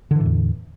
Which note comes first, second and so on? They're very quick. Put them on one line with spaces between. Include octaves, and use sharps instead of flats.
D3 E3 A2 E2